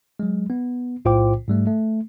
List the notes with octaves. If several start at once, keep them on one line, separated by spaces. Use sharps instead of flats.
F#3 G#3
B3
B1 A2 F4 C5 G5 D6
G#2 G3 A3
A3